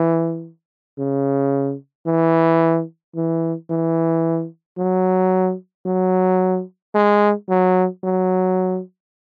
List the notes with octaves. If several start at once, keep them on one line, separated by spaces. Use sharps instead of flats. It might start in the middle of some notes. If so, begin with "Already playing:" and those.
Already playing: E3
C#3
E3
E3
E3
F#3
F#3
G#3
F#3
F#3